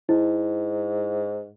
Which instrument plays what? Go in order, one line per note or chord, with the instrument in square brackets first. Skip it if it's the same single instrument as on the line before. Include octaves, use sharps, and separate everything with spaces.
[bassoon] G#2 [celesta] E4